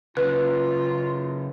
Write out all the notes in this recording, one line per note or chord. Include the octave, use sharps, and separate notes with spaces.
F#2 C#3 F4 B4